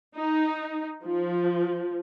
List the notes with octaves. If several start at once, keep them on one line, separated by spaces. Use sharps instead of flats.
D#4
F3